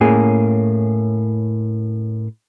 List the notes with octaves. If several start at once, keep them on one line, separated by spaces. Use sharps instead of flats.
A2 A#3 C#4 G#4